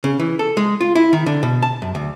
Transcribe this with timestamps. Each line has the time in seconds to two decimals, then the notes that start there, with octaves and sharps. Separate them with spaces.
0.04 C#3
0.19 E3
0.39 A4
0.57 G#3
0.81 F4
0.95 E4
1.13 D#3
1.26 D3
1.43 B2
1.62 A5
1.82 F#2
1.95 D2